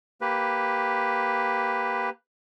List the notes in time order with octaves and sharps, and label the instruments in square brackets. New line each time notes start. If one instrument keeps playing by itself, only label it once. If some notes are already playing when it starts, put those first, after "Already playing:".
[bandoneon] A#3 G4 B4